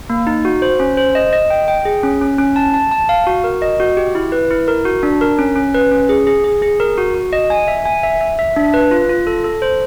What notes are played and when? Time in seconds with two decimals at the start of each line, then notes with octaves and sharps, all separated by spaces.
0.10 A#3
0.27 D#4
0.45 F#4
0.62 C5
0.80 C#4
0.97 C5
1.15 D#5
1.33 D#5
1.50 G5
1.68 G5
1.85 G#4
2.03 C#4
2.21 C#4
2.38 C#4
2.56 A5
2.74 A5
2.91 A5
3.09 F5
3.27 F#4
3.44 A#4
3.62 D#5
3.80 F#4
3.97 G4
4.15 E4
4.32 B4
4.51 E4
4.68 A#4
4.85 F#4
5.03 D4
5.21 A#4
5.39 C#4
5.56 C#4
5.74 B4
5.92 C#4
6.09 G#4
6.27 G#4
6.44 G#4
6.62 G#4
6.80 A#4
6.98 F#4
7.15 F#4
7.33 D#5
7.50 G#5
7.68 E5
7.86 G#5
8.03 E5
8.21 E5
8.39 E5
8.56 D4
8.74 B4
8.91 F4
9.09 F4
9.27 A4
9.44 A4
9.62 C5